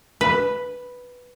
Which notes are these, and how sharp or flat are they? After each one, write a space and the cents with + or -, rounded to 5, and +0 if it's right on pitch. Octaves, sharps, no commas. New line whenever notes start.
B4 +0